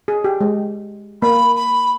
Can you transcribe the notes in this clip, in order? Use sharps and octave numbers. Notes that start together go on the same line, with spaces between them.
G#4
G4
G#3
A#3 B5
B5